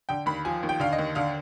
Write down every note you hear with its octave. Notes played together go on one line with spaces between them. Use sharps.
D3 G5
D#2 B5
F3 G#5
D#2
G5
D3 F5
D#5
D#2
D3 F5